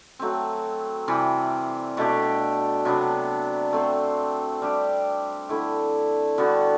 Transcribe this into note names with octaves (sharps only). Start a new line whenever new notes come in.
F#3 A3 C4
C3 E3 G3
B2 A3 D4 G4
C3 F#3 B3 D4
A3 C4 F#4 C5
G3 D4 G4
D3 A3 E4
D3 G3 B3 F#4